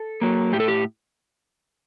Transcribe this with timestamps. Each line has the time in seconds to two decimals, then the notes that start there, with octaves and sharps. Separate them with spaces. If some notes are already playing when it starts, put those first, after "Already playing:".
Already playing: A4
0.21 F#3 A#3
0.52 A2 G4
0.60 A4
0.68 G4